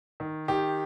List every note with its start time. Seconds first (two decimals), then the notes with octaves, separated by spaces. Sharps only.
0.20 D#3
0.48 D#3 G4